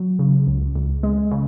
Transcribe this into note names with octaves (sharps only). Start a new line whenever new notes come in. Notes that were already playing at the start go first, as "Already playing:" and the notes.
Already playing: F#3
C#3
C#2
C#2
G#3
C#3